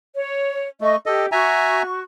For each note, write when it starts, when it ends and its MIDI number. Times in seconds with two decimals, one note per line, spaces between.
0.16 0.67 73
0.81 0.96 57
0.81 0.96 75
0.81 0.96 85
1.06 1.29 67
1.06 1.26 69
1.06 1.26 75
1.32 2.02 66
1.32 1.82 76
1.32 1.82 80
1.32 1.82 82
1.32 2.02 85